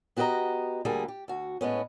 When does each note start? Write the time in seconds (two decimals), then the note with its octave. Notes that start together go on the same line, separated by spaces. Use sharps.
0.16 B3 F#4 G4 B4 D#5 A#5
0.85 D2 G3 A#3 G#4
1.08 G4
1.28 D2 F#4
1.61 A2 G#3 B3 C#4